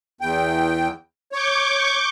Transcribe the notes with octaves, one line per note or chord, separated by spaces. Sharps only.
E2 G5
C#5 C#6 D6 G6